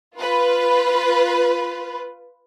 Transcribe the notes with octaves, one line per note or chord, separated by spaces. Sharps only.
F4 B4